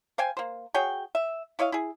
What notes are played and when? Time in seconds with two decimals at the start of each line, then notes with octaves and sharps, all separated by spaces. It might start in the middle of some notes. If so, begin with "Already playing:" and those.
0.18 C5 F5 G5 G#5
0.37 A#3 C5
0.74 F#4 G#4 C#5 G5
1.15 E5
1.59 E4 C#5 D#5 F5
1.72 E4 G#4